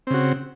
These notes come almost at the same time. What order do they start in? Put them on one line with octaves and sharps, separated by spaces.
C4 C#3 F#4